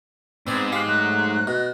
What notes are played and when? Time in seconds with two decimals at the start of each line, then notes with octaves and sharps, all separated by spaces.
0.47 G#2 B3 C4 D5
0.73 G4 F5 F#6
0.87 F#3 A3 A#5 F#6
1.47 B2 D#5